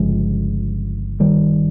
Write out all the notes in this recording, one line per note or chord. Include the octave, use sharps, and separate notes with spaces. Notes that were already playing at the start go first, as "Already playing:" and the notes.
Already playing: G1 C#3 F3 G#3
D#3 G3